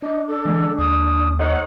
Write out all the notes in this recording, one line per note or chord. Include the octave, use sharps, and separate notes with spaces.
D4 D#5
A4
D3 E3 G#3
D#2 D#6
D#4 A4 C5 C#5 D#5 F#5